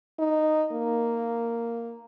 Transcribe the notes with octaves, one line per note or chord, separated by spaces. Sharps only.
D#4
A#3